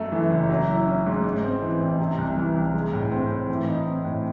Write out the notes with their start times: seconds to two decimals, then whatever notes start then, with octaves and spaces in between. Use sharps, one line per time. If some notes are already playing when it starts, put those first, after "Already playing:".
Already playing: F#2 A3
0.12 E3
0.31 F#1
0.50 F#3
0.68 E4
0.87 C#4
1.06 G#2
1.24 G#2
1.43 C4
1.62 E3
1.80 A1
1.99 C3
2.18 C2
2.36 E3
2.55 C2
2.74 G#3
2.93 A2
3.11 C4
3.30 A2
3.49 E3
3.67 D#4
3.86 C4
4.05 A2